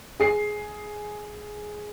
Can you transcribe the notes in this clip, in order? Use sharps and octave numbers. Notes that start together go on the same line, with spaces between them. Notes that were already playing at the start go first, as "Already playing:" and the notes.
G#4 C7